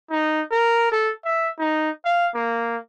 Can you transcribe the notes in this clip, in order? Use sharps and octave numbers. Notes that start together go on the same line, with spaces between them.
D#4
A#4
A4
E5
D#4
F5
A#3